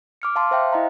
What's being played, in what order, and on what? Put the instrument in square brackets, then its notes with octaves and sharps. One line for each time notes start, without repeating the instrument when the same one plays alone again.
[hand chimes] D6 F6 C#7
F5 A5 C6
C5 E5 F5 G5
E4 D#5 F5 A#5